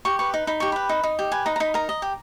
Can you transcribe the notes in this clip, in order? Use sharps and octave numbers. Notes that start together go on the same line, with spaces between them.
G4 C#6
B4 C#6
D#4
D#4 B5
G4 C#6
B4 B5
D#4
D#4
G4
B4 G#5
D#4 A#5
A#5
D#4 B5
A#4 A#5
D#5
G4